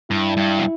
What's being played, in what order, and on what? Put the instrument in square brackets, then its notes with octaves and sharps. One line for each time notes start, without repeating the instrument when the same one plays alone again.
[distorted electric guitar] G2 [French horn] E4
[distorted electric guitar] G2
B2